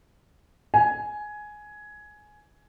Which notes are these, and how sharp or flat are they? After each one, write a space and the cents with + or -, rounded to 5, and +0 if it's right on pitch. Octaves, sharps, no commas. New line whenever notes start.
G#5 +10